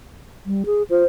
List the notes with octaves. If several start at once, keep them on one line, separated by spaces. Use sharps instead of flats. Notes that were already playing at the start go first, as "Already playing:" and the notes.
G3
G#4
F4 C5